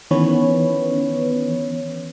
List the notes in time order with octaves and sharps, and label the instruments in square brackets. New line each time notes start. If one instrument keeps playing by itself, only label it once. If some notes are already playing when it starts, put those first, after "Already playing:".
[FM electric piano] D#3 E3 B3 C#4 B4 C#5